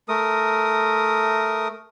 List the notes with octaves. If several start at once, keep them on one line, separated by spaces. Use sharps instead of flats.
A3 A#4 D#6